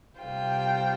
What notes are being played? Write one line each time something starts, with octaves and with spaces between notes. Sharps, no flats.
C3 G3 F4 C5 G5